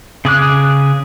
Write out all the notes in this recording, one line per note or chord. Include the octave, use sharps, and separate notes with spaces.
C#3 G#4 D6 F#6